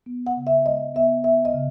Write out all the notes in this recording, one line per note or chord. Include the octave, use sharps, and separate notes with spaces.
B3
F#5
C#3
E5
G#3 D#5
B3 E5
B3 E5
D#5
C#3